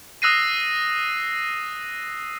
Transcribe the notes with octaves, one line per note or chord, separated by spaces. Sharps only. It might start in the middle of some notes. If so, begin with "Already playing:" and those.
D#6 E6 F#6 A#6 C7 D#7